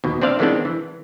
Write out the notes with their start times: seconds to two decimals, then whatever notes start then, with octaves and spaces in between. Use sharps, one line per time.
0.04 D#2 B2
0.22 C4 D4 C5 D5 E5 F5
0.39 D#3 E3 G#3 B3 C4 D4
0.65 E3